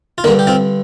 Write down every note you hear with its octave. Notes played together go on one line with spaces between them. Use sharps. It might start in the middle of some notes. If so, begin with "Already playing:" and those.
F4
G2 D3 A#3 D4
G4
C4 F4